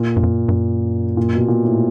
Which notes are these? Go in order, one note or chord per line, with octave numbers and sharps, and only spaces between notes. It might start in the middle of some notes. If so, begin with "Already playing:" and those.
Already playing: A#2
G2
F#2
G2
F#2
A#2
B2
A#2
A2